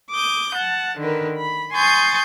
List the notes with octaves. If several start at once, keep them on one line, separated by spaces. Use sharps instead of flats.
D6 D#6 G6
F#5 A5
D3 D#3 A#4 B4
B5
G#5 C6 C#6 D#6 G6 A6